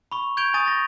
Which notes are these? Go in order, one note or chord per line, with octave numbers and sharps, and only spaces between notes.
B5 C#6
C#6 G6 G#6 D7 F7 G7
G#5 C#6 D#6 A6 D#7
A#6